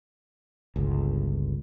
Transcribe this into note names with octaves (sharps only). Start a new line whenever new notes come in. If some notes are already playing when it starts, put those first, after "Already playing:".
G1 C#2